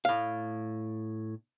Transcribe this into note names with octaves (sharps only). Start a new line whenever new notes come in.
A2 F5